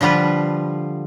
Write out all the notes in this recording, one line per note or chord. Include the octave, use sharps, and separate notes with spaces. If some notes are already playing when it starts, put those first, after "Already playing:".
D3 F3 G3 F4 B4